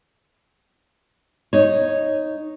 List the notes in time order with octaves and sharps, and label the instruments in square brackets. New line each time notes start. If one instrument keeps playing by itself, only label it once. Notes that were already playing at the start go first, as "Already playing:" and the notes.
[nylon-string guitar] D#4 C#5